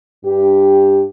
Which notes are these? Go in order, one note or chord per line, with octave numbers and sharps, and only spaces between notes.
G2 G4